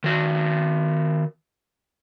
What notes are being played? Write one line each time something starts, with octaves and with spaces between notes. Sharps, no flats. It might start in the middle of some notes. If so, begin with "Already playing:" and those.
D#3 F#4